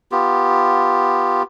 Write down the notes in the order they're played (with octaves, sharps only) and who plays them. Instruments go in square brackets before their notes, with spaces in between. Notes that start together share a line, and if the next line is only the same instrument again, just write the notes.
[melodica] B3 F4 G4